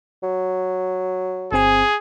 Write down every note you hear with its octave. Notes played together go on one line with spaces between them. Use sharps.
F#3
G1 C4 G#4 G#5